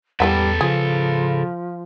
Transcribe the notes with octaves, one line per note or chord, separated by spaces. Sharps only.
E2 E3 G3 A4 B4 E5 F#5
C#3 F3 G#4